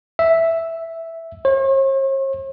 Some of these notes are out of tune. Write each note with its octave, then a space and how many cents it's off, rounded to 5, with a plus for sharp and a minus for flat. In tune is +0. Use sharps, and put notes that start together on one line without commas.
E5 +0
C#5 -45